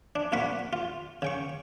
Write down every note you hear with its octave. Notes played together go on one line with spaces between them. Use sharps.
D4
C2 A#2 A#3 F#5 B5 C#6
F4
C#3 G5 C#6